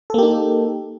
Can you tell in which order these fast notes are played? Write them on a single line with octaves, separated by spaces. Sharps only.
A4 A#3 G4 D#4